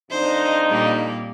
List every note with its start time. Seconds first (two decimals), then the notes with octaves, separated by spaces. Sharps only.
0.11 F2 D4 D#4 C5
0.69 A#2 G3 A#3